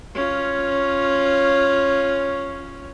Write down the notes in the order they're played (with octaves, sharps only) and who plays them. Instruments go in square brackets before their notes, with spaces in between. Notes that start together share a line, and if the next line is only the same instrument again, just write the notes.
[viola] C#4 F4